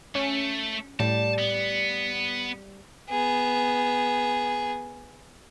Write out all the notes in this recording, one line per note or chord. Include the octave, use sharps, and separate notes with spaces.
A3 C#4
A2 G3 A5
B3
B3 G#4